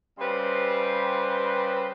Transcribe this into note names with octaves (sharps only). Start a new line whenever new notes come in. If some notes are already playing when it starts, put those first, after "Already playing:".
C#3 G3 C4 B4 C6